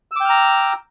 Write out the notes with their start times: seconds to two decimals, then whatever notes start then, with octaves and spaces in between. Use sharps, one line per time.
0.11 E6
0.16 D6
0.20 G5
0.25 F6
0.29 A#5